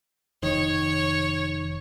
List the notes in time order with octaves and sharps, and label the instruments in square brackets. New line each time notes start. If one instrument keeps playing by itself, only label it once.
[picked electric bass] F1 D#3 [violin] C#5